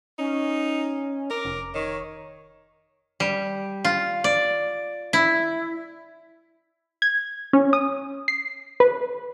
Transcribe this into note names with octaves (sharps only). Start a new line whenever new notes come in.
C#4 D#4
A#4 D6
F1
D#3 C#5
G3
F4
D5
E4
G#6
C#4
D#6
C7
B4